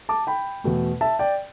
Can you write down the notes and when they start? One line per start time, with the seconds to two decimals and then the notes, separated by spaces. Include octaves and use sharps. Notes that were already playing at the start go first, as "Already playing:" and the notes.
0.09 A5 D6
0.27 G5 B5
0.64 E2 B2 A3
1.01 E5 A5
1.19 D5 G5